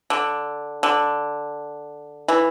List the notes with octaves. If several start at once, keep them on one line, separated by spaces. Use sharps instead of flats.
D3
D3
E3